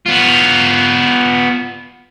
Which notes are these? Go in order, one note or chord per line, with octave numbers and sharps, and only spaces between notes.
B3 F4